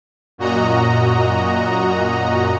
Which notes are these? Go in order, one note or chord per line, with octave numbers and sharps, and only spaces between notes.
F#2 A#2 F#4 D#5 A#5